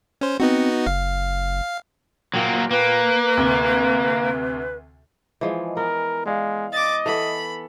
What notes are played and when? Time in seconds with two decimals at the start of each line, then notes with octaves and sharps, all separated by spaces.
0.21 C#4 C5
0.40 B3 C4 D#4 F#4
0.87 F#1 F5
2.34 A#2 F#3 A#3 G5
2.71 A#3 B4
3.37 D2 C3
5.41 E3 F3 G#3
5.77 B3 A#4
6.26 G#3 D5 F5
6.73 D#5 D6 A6
7.06 E3 B3 A4 B5